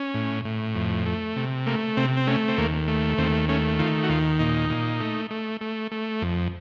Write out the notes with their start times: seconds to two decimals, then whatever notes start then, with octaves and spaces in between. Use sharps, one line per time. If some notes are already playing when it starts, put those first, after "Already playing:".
Already playing: C#4
0.14 A2
0.45 A2
0.75 F2
1.06 A3
1.36 C3
1.66 A3 A#3
1.97 C3 C4
2.17 C4
2.27 A3 C#4
2.48 C4
2.58 D#2 A#3
2.88 A3
3.18 D#2 C4
3.49 A3 C#4
3.79 D#3 F4
4.03 F#4
4.09 D#2 F4
4.39 A#2 D#4
4.70 A#2
5.00 A3
5.31 A3
5.61 A3
5.91 A3
6.22 F2